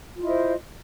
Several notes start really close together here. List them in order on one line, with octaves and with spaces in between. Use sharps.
F4 E4 D#5 C5